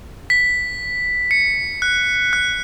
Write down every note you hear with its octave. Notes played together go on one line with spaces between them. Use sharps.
B6
C#7
F#6
F#6